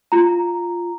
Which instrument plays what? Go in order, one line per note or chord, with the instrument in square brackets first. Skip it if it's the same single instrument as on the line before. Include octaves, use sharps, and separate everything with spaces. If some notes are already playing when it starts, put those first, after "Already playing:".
[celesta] F4 A#5